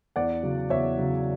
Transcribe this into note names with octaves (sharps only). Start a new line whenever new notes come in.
E2 D5 F#5
C#3 F#3
E2 C#5 E5
C#3 F#3